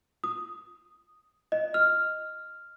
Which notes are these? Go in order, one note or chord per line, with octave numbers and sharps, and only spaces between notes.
D#6
D#5
F6